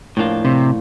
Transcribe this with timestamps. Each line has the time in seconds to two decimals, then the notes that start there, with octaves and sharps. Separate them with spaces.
0.17 A2 F3 A#3 D4 F4
0.45 C3